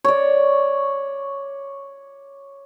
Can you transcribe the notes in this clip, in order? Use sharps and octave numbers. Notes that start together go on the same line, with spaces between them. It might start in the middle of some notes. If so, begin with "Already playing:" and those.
C#5 D5